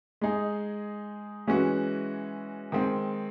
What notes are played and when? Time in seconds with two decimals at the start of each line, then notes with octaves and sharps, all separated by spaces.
0.21 G#3 D#4 G#4
1.47 E3 G#3 C#4 F#4
2.72 D#3 G#3 C4